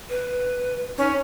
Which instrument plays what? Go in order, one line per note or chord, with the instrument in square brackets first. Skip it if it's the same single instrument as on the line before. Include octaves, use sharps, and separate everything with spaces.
[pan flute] B4
[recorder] C#4 [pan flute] D#4